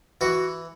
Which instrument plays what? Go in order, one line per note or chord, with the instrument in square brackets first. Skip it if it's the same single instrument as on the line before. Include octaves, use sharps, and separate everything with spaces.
[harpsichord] E3 F#4